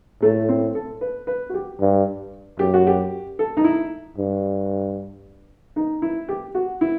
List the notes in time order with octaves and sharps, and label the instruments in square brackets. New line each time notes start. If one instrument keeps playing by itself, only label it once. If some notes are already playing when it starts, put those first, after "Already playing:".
[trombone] A2 [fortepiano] A3
[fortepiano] C4
A4
B4
B4
F#4
G4
[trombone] G2
[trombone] F#2 [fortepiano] G4
[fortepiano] F#4
G4
A4
D#4
E4
[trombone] G2
[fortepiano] D#4
E4
G4
F#4
E4